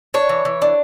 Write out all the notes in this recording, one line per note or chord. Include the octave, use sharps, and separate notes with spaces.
D4 C#5
E3
E3
D4